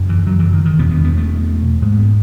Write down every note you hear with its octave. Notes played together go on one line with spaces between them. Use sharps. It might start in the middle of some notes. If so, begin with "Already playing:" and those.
Already playing: F#2 C#3
E3
F#3
E3
D#3
D#3
E2 B2 B3
B3
B3
A3
G#2 G#3
B3